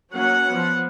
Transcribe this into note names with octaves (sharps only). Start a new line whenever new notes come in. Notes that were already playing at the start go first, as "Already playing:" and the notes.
F#3 A#3 C#4 F#5
F3 B3